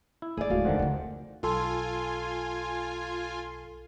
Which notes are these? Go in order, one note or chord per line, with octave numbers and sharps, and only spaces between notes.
E4
D#3 A3 G#4 D5
D1 G#3 A3 F#4 F5
F2 D3 D#3 C5 F#5
D3 D#3 A3
B1 F4 A4 G#5 C6